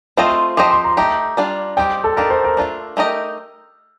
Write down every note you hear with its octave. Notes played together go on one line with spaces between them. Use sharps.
A3 C4 F4 C5 D#5 C6
F3 C4 G4 C5 D#5 D6
C6
A#5
A3 D#4 G4 A#5
G3 D4 F4
G3 C4 D#4 G4 G5
A4
D#3 A#3 D4 G4 A#4
C5
A#4
A3 D4 F4
A3 D#4 G4 A#4 D#5